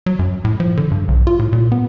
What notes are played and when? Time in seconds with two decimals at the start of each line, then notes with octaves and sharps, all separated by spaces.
0.06 F#3
0.19 F#2
0.45 A2
0.60 F3
0.77 D3
0.91 G2
1.08 B1
1.27 F4
1.39 A2
1.53 A#2
1.72 B3